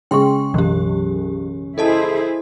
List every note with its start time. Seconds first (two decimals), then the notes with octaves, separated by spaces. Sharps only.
0.11 C#3 G#3 G5 C6 C#6
0.54 B1 F#2 E3 G4
1.78 E4 G#4 A4 C5 D#5 A5